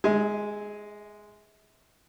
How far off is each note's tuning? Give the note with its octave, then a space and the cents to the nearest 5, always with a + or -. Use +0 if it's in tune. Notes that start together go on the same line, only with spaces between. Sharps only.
G#3 +0 E5 -40 G#5 +0